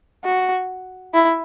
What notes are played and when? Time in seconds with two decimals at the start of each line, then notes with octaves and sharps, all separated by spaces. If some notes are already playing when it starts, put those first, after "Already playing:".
0.24 F#4
1.14 E4